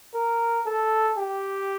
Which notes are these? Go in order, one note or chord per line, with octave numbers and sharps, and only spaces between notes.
A#4
A4
G4